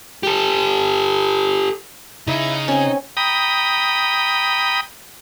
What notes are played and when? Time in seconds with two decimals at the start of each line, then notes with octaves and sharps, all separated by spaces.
0.23 G4 A4
2.28 C#3 D#4 E4 E5
2.68 C4 C#4 G#5
3.17 G5 A#5 B5 D#6